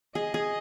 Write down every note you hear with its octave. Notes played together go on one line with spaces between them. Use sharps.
G#4 D#5
G#4